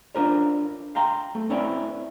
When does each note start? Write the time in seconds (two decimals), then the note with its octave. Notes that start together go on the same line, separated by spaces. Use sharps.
0.15 C#4 D4 F4 A#4 C5 C#5
0.95 F5 G5 A#5 C6
1.35 A3
1.50 C4 C#4 E4 B4 C#5 D5